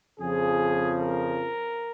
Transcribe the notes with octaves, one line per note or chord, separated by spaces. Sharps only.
F2 C#3 F3 G#4
A#4